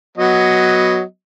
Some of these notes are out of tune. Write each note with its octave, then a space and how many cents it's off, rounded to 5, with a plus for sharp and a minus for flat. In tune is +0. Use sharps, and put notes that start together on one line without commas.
F#3 +0 B3 +0 D#5 +0